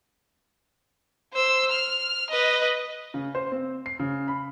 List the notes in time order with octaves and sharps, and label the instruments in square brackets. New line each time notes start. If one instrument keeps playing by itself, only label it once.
[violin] C5 E6
F6
B4 D#5
[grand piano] C#3
C5
C4
C7
C#3
B5